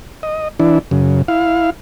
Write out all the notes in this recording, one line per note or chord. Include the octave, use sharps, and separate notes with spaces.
D#5
E3 D4 E4
F#2 C#3
E4 F5